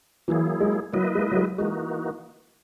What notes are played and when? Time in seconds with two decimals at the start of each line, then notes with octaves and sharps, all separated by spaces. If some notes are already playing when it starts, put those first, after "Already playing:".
0.28 E3 F#3 A#3 E4 G#4
0.60 G#3
0.93 F#3 A#3 E4 B4 D#5
1.15 G#3
1.31 F#3
1.36 G#3
1.58 E3 G#3 A#3 D#4 F#4